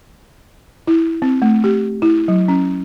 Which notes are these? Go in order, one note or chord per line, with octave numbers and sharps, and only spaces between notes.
E4
C4
A3
G4
E4
F#3
C#4